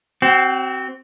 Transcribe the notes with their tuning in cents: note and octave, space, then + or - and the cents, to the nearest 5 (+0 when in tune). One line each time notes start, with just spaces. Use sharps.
C4 +0 F#4 +40